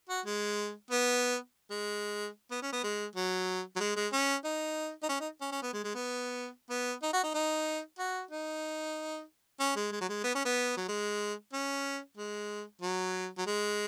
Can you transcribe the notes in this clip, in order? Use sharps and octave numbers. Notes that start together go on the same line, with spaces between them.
F#4
G#3
B3
G#3
B3
C#4
B3
G#3
F#3
F#3
G#3
G#3
C#4
D#4
D#4
C#4
D#4
C#4
C#4
B3
G#3
G#3
B3
B3
D#4
F#4
D#4
D#4
F#4
D#4
C#4
G#3
G#3
F#3
G#3
B3
C#4
B3
F#3
G#3
C#4
G#3
F#3
F#3
G#3